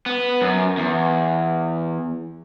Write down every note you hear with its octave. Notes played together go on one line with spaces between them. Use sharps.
B3
F#2
E2